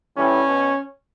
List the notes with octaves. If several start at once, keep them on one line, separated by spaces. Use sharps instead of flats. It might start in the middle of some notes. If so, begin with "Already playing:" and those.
A2 E3 G3 C#4
B2